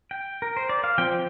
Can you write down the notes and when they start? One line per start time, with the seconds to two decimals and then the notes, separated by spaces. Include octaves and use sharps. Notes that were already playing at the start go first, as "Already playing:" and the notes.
0.11 G5
0.42 A#4
0.57 C5
0.69 D5
0.84 F5
0.98 F3 C4 G5